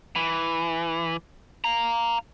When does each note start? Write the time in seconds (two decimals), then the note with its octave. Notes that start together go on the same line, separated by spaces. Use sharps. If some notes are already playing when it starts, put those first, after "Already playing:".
0.16 E3
1.64 F5 A#5